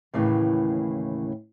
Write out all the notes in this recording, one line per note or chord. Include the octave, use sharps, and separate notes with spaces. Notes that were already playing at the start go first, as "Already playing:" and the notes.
D#2 A2 C#3 E3